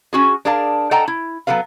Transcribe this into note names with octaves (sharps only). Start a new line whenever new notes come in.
C#4 F#4 G#4
D4 G#4 A#4 F5 A5
A4 D#5 F#5 G5 A5 A#5
E4
F#3 B3 A4 B4 F5